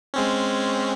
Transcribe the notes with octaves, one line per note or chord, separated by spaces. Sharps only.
G#3 C4 C#4